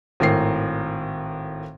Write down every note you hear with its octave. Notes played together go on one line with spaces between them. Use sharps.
G#1 A2 A#4 C7